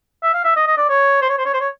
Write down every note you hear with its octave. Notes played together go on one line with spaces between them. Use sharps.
E5
F5
E5
D#5
D#5
D5
C#5
C5
C#5
C5
C#5
C5
C#5